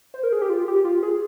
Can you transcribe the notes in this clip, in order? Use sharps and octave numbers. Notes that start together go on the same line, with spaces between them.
C5
A#4
G#4
G4
F4
G4
F4
G#4